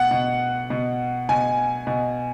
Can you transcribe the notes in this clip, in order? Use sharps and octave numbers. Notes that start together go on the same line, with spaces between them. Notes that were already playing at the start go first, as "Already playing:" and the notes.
Already playing: B2 F#5
B2
B2
B2 G#5
B2